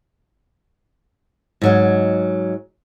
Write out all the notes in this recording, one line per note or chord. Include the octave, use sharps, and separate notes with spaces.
G#2 F#3 D#5